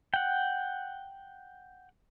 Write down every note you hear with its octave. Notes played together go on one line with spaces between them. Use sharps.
F#5 G5